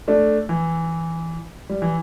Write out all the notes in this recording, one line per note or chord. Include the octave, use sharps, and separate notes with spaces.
A3 D4
E3
G3
E3